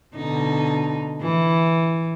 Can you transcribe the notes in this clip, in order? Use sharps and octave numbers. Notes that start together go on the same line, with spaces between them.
B2 D3 D#4
E3